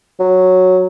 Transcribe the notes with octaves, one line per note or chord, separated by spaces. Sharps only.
F#3